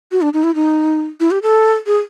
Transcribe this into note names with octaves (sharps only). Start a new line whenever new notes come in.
F#4
D4
D#4
E4
D#4
E4
G4
A4
G#4